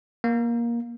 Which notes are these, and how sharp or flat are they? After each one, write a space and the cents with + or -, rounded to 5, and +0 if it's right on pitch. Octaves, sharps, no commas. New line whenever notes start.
A#3 +15